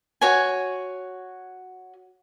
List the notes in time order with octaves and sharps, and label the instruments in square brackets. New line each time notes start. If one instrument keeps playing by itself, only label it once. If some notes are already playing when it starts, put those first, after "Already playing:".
[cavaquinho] F#4 C#5 G#5